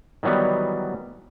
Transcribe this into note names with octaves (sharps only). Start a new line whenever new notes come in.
D#3 E3 F#3 G3 B3